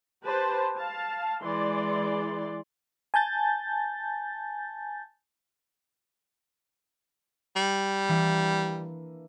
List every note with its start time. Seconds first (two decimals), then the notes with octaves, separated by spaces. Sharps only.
0.24 G4 B4 C5 A5
0.78 F5 A5
1.42 E3 G#3 D5 C6
3.14 G#5 A5 G6 A6
7.56 G3
8.09 E3 A#3 D4